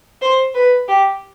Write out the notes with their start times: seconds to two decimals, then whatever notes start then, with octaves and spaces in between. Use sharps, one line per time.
0.22 C5
0.55 B4
0.88 G4